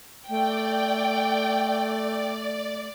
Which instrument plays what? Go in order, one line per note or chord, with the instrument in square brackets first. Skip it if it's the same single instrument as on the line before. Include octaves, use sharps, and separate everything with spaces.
[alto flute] A3 [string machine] D5 [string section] G5